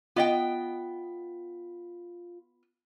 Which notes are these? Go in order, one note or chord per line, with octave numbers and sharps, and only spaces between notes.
B3 F4 D#5 G5